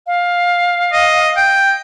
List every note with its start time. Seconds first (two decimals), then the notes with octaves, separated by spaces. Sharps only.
0.07 F5
0.93 D#5
1.37 G5